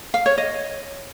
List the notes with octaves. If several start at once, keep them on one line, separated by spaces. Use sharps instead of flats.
F5
C#5
D#5